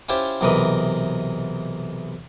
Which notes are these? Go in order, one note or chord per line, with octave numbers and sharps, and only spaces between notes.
C#4 E4 F4 G4 C5
B1 C3 E3 A#4 B4 D#5